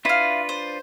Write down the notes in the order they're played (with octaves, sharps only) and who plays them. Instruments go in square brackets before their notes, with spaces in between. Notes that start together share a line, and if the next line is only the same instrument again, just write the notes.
[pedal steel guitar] D4 F4 B4 [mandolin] E4 F5
[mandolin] C5